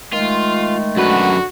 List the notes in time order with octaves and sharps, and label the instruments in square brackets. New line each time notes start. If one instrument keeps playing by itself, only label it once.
[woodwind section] D#3 G#3 A3 [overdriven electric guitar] F4
[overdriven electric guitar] F#2 B4 [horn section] D3 F#4